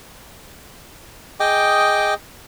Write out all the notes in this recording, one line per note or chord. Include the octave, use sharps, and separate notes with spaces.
G#4 D#5 G5 D6